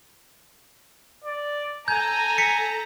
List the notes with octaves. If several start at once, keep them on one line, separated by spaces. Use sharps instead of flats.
D5
A4 G#5 A#5 G6
B6 C#7